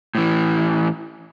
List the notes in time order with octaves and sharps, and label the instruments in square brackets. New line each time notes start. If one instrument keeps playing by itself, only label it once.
[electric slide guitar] A2 E3